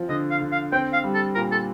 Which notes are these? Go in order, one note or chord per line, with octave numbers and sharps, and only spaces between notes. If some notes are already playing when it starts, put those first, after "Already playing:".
Already playing: F3 C4
D3 D#5
F5
D3
F5
C4 G5
F5
G3
A4
A#2 A#4
A4